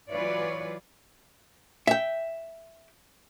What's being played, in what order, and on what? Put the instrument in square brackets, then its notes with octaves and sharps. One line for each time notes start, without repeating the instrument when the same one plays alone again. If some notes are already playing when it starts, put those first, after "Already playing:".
[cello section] E3 F#3 F4 B4 C#5 D5
[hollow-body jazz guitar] E5 G5